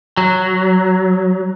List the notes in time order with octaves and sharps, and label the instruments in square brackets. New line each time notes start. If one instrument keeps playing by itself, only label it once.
[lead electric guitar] F#3